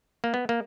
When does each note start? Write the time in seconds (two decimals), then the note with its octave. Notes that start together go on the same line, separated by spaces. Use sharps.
0.24 A#3
0.34 B3
0.49 A#3